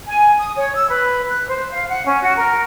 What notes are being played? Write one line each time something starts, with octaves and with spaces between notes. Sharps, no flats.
G#5
D#6
C#5
E6
B4
F#6
C5
F5
F#5
C#4
F#4
A#4